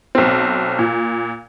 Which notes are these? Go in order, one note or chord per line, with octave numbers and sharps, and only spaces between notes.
B1 C4
A#2